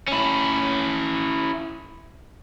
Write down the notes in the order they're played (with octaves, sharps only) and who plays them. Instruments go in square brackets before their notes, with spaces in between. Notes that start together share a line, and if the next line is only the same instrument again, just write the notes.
[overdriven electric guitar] C#4 E4